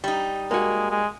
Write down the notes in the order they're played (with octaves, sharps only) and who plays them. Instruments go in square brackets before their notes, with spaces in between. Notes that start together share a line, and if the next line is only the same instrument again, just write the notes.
[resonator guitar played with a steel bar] G3 D#4
[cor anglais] G#3 [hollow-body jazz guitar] A#3 F#4
[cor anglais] G#3